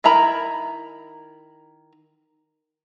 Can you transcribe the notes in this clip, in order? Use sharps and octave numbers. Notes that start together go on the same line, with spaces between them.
D#3 E4 A#4 A#5 B5